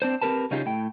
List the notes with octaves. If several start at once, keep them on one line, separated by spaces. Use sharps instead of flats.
C4 D4 C5
C4 G4 A#4 B4 A5
C#3 C#4 D#4 F4 G4 G#4
A2 G5